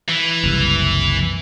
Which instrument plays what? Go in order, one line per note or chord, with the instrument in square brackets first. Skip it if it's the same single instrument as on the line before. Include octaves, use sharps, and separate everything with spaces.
[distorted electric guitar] E3
[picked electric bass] F#1 C2